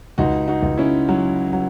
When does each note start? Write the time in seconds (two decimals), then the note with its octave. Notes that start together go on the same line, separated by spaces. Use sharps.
0.18 C#2 D#4 F#4
0.48 D#4 F#4
0.63 C#2
0.78 C#4 E4
1.09 F#3
1.53 F#3